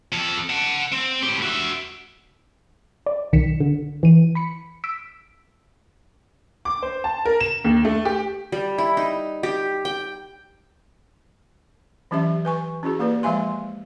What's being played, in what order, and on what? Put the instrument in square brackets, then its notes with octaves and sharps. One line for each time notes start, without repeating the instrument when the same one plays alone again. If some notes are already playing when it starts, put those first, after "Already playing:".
[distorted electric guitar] F2 A4
F#5 A5
C4
A2 G4
F#4 E5
[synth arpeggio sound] D5
B1 D#3 B6 C#7 E7
D3
E3 D#7
B5 B6 C#7
E6 B6 D7
[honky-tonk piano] D6
C5
A5
A#4
E7
D#2
A3
G4
[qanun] G3
E4
D#4
G4
G5
[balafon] E3 F#3 C#4 G4 E5
B4 G#5 C#6
C#4 E4 F#4 G#4
A#3 E4 G4 B4 D5
F3 G#3 E5 F5 G#5 C6